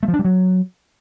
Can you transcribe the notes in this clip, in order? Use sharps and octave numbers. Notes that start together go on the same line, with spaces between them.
A3
F3
D4
G3
F#3